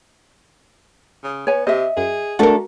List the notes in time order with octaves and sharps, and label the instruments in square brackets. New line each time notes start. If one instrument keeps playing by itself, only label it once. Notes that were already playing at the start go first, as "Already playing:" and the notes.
[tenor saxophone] C#3
[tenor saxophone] B3 [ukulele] C#5 G#5
[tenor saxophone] C3 [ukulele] D#5 E5
[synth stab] F#2 [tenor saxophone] G#4
[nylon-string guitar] A3 D4 A4 [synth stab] F#4 A#4